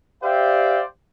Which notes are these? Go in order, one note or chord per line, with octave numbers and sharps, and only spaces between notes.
G4 C5 D5 E5 F5 G5